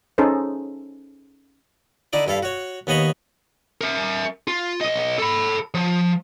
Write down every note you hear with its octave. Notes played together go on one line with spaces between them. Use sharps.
C#4 D#4 G#4 A4 C5
D3 D#4 E4 D5
G2 E4 A4 F5
F#4 C#5
D#2 B3 C#5 D#5 B5 C#6
A#4 E5
F4
B1 D#5
A4 B5
F3